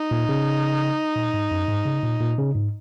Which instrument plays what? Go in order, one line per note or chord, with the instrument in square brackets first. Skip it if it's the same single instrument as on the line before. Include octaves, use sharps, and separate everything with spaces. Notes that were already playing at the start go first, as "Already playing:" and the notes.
Already playing: [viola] D#4
[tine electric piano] A#2
C#3
A#2
G#2
F#2
G#2
C#3
A#2
A#2
C#3
G#2